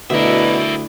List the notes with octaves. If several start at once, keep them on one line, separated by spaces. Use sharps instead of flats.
D2 B2 E4 A#4 D5 E5